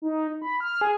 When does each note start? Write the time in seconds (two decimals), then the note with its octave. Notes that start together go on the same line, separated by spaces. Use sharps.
0.02 D#4
0.42 B5
0.60 F6
0.81 G#4